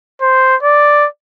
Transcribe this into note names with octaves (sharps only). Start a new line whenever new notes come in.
C5
D5